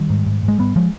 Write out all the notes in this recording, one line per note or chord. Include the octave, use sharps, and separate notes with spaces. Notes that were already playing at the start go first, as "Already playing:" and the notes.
Already playing: D#3 G3
G#2
G#2
G#2
G#3
G#2 G3 B3
F3 G#3